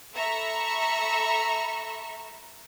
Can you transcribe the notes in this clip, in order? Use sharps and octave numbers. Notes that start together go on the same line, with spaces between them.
A4 E5 A#5 B5 C#6 E6